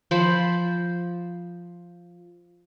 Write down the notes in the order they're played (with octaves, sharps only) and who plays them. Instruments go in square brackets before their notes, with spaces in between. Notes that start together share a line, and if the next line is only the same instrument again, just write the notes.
[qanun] F3 C5 B5